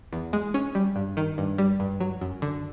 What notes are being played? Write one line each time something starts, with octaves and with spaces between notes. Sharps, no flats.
E2
G#3
C#4
G3
G2
D#3
G2
G3
G2
F#3
F#2
D3